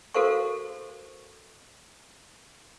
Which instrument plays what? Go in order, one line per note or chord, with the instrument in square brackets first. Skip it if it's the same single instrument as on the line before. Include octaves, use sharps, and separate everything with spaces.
[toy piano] F#4 A4 A#4 C5 F5 C#6